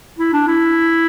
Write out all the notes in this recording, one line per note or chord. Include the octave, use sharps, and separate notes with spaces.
E4
D4
E4